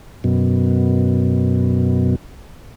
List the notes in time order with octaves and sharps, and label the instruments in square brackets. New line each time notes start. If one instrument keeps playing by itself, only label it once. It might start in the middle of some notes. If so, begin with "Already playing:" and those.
[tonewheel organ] F#2 B2